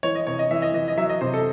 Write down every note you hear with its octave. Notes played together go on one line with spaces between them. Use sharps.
E3 C#5
D#5
C3 C#5
D#5
E3 E5
D#5
E3 D#5
D#5
F#3 E5
D#5
C3 C5
A4